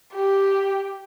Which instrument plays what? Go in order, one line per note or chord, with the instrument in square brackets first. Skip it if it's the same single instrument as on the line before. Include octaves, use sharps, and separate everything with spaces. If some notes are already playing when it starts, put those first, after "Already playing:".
[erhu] G4